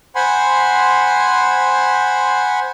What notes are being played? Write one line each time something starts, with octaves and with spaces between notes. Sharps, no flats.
C5 F#5 G#5 B5 C6